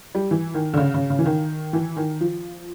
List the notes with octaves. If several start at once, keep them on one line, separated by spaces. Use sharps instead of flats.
G3
E3
D#3
D3
C#3
C#3
C#3
E3
D#3
E3
D#3
F3